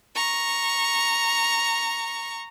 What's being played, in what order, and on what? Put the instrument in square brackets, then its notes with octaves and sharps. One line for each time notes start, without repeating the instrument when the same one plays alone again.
[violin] A#5 C#6